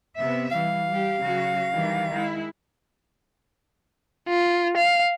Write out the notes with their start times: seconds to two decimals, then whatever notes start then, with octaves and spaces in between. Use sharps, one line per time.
0.17 C3 B3 E5
0.51 E3 G3 F5
0.87 G3 G4
1.19 C#3 F#3 F#4
1.74 D#3 E3 G3
2.14 G#3 E4
4.28 F4
4.77 F5